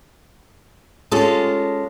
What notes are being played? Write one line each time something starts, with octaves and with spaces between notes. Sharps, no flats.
G#3 C#4 F4 G4 A4